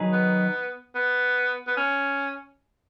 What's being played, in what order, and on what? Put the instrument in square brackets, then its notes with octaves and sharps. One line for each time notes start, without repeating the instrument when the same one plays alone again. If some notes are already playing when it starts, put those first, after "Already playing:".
Already playing: [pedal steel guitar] D#3 F#3 D#4 G#4 B4
[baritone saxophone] B3
B3
B3
C#4